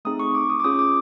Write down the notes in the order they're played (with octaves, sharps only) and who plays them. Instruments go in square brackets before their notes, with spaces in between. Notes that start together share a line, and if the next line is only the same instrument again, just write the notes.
[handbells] A3 C4 D#4 G#4 D#6
C#6
D6
D#6
D6
C#4 F4 G#4 D#6
D6